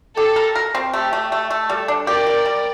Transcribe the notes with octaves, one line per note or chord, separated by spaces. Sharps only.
G4 A4
A#4
A#4
C4
A3 G4
A3
A3
A3
G3 A4
D4
G4 A#4 D5
G4
G3